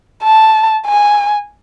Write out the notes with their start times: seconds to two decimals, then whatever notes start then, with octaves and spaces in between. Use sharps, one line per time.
0.23 A5
0.86 G#5